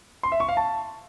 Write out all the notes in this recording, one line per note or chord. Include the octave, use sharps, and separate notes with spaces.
C6
E5
C#6
F5
A5